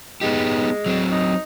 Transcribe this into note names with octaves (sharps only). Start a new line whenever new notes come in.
G#3 B3 D#4 G4
F#3 C4
D#4